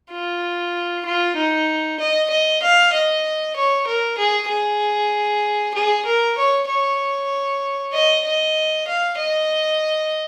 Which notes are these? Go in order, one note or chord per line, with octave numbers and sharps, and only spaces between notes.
F4
F4
D#4
D#5
D#5
F5
D#5
C#5
A#4
G#4
G#4
G#4
A#4
C#5
C#5
D#5
D#5
F5
D#5